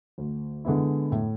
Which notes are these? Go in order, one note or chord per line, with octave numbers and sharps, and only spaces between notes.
D2
D3 G#3 B3 E4
A2